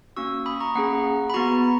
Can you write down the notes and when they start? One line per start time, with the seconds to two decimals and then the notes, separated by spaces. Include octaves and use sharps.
0.16 A#3 C#4 F#4 C#6 E6
0.46 B5 D#6
0.60 A#5 C#6
0.75 A#3 C#4 G#4 F#5 A#5
1.30 B5
1.34 B3 F#4 A#5 C#6